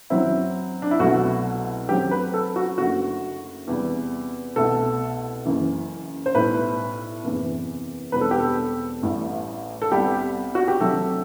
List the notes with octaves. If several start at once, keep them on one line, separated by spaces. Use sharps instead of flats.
F#2 F#3 C4 E4
D4
E4
C2 B2 F#3 A3 F#4
F#2 F#3 A3 C4 G4
B4
A4
F#4
F#1 F#2 D3 A3 F#4
E2 C3 G3
C2 B2 A3 A4
F#1 F#2 E3
C5
B1 A2 G3 B4
F#1 E2 C3 E3
E1 E2 D3 G3 C4 B4
A4
G4
A4
A1 A2 G3
A4
C2 C3 G3 B3 G4
F#4
G4
D2 C3 F#3 A3 A4